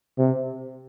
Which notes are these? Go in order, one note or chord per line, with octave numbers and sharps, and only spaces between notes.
C3